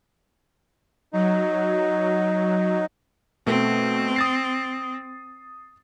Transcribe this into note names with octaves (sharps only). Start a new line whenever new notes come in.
F#3 D#4
B2 A3 C4
D#6 A6 C7